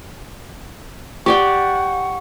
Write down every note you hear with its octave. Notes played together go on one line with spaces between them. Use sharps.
G4 D5 F#5 G5 C#6